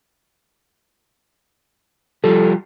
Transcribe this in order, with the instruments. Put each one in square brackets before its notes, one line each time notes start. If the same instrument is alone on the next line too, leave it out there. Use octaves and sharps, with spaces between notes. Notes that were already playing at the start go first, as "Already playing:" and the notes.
[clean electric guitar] F3 G3 [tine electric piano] A4